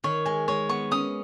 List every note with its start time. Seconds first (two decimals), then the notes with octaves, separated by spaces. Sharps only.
0.04 D#3 C#5
0.25 G#3 G#5
0.48 G#3 C#5
0.69 B3 C#6
0.91 C#4 D#6